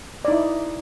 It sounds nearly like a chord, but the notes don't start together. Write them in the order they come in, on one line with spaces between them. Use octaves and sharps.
D5 D#4 E4